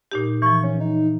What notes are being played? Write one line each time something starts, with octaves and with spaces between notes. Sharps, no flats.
A#2 D#4 G4
E3 F3 C#6
C#4
D#4